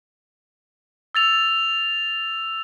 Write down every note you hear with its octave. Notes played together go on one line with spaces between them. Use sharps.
E6 A6 F7